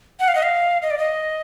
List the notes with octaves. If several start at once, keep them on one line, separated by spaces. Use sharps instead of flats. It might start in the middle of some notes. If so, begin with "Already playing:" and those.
F#5
F5
D#5
F5
D#5
D5
D#5